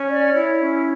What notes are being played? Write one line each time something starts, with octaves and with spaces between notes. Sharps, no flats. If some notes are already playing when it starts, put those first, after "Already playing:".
Already playing: C#4
C#5 D5
E4
C#4